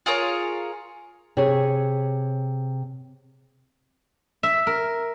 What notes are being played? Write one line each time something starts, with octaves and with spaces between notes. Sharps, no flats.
F4 G#4 A#4 C#5
C3 G#4 C#5
E5
A#4